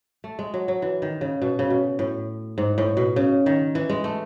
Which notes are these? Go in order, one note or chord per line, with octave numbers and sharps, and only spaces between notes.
A3
G#3
F#3
F#3
E3
D#3
C#3
B2
C#3
B2
A2
G#2
A2
B2
C#3
D#3
E3
G#3
A3